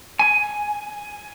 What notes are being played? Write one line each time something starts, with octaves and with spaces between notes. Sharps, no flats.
G#5